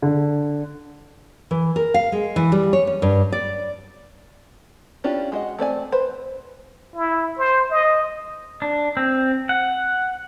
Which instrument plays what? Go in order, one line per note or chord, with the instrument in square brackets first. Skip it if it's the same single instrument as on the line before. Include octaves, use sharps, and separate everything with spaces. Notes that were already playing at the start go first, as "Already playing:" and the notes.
[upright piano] D3
[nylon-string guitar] E3
A#4
F5
G#3
E3
G3
C#5
C#4
G2
D5
[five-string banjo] C#4 D4 E4 F4 G4
G#3 F#4 D#5
A3 C4 D5 G#5
B4 C5
[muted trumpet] E4
C5
D#5
[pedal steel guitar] D4
C4
F#5